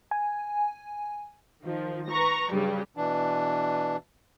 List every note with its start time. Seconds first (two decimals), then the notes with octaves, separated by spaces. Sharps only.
0.11 G#5
1.63 D#3 F3
2.09 B4 A#5 C#6 A#6
2.50 G2 C#3 F#3 G3
2.97 B2 E3 D4